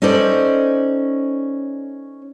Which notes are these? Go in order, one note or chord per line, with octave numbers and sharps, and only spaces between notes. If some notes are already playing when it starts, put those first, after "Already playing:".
C#4 D#4 A4 C5 D5